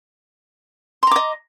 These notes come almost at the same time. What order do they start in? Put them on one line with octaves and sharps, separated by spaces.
C6 A#5 D6 D#5